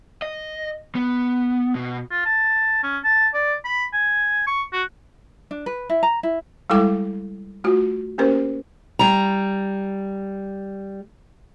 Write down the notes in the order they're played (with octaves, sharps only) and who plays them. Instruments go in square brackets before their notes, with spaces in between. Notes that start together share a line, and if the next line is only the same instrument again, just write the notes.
[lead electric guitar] D#5
B3
B2
[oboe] F4
A5
C#4
A5
D5
B5
G#5
C#6
F#4
[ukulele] D4
B4
E4
A#5
E4
[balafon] G3 G#3 E4 A4 G5 D6
A3 F4 F#4
A#3 C#4 G4 A#4 C5
[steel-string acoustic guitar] G3 A#5